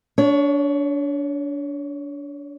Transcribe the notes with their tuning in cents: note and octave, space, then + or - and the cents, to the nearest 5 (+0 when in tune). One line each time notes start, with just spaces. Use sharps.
D4 -30 C#5 +15